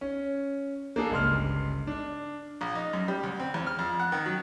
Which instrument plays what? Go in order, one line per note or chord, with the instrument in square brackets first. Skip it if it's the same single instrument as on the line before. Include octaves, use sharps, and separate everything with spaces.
[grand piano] C#4
A#3 D4 G#4 A4
G1 C#2 C6 F6
D4
[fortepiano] A#1
D#4
F#2
G3
D2
C4
E2
F6
F2
F#5
D#3
F#3